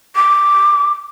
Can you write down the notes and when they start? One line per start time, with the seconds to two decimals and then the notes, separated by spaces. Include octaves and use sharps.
0.16 D6